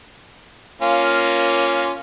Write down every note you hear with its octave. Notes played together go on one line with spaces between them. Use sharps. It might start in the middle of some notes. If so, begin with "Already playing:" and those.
A#3 C#4 F4